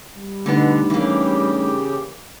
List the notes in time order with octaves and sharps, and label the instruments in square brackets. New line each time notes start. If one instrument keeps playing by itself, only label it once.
[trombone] G3
[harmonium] B2 [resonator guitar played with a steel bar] D3 B3 [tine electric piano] A3 D4 D#4
[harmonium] C#3 G4 [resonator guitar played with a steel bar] E3 A#3